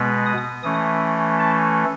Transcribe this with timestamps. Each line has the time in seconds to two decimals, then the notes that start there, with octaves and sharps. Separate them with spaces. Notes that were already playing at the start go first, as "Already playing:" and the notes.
Already playing: B2 G#3 B3
0.26 D#6
0.63 E3 A3 C#4 D#6
1.39 A5